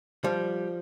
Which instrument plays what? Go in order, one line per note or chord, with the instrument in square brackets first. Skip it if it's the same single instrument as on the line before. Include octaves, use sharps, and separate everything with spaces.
[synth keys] F3 [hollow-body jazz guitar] G3